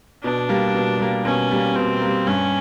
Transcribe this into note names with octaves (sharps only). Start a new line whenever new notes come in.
B2 D4
G3 A#3
B2
G3 A#3
B2 C#4
G3 A#3
B2 C4
G3 A#3
G2 C#4